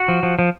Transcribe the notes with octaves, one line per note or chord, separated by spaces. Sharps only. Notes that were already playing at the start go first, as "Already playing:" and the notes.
Already playing: F#4
F3
F3
F3